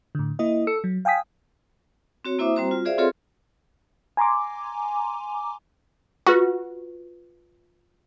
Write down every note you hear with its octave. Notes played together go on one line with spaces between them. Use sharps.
A2 D3
A#3 E4 D#5
A4 E6 C#7
F#3
F5 G5 G#5 D#6 B6
C4 F#4 C#5
A#3 E4 C5 E5 D6 D#6
G3 C4 F#4 C5 A#5
F4
F#4 G#4 C5 D5 E5 F5
C4 F4 G#4 A4 C#5 C6
G#5 A#5 C6 D6
F4 F#4 B4